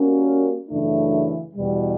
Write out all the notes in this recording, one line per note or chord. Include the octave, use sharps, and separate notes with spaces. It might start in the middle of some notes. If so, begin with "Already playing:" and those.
Already playing: G3 A#3 C#4 F#4 A#4
F#2 C#3 E3 A3 D4
E2 B2 G3